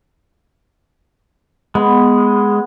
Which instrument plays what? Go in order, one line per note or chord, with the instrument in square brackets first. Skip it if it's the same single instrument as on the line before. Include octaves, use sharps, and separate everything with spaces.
[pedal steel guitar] G#3 [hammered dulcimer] B3